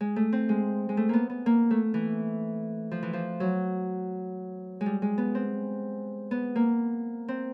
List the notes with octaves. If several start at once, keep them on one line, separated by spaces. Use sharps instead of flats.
G#3
A3
C4
G#3
G#3
A3
A#3 B3
B3
A#3
A3
E3
F3
E3
F3
F#3
G#3
G3
G#3
B3
C4
B3
A#3
C4